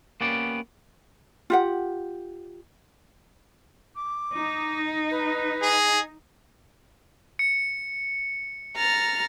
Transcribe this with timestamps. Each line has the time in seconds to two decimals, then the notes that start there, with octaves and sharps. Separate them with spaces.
0.21 A#3 B3 C#4 G4 D5
1.50 F4 G4 F#5
3.95 D6
4.35 D#4
5.11 B4
5.62 G#4
7.39 C#7
8.76 A#5 F6 A6